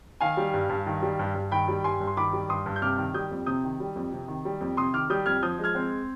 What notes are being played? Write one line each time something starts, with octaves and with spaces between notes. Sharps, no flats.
D#3 F5 G#5
G3
G2
G2
D#3
G3
G2
G2
D#3 G5 B5
G3
G2 G#5 C6
G2
C6
D#3 B5 D6
G3
G2 C6 D#6
G2
G6
C3 D6 F6
D#3
G3 D#6 G6
F2
C3 D#6 G6
D#3
G3
F2
C3
D#3
G3
F2
C3 C6 D#6
D#3 D6 F6
G3 D#6 G6
F2 F6 G#6
F3 D#6 G6
G#3
F6 G#6
C4